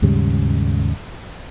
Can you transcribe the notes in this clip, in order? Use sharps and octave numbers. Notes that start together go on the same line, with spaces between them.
D#2 G#2 C#3 G3